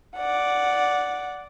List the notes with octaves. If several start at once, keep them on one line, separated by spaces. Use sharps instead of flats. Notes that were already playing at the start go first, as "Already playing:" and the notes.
D5 F#5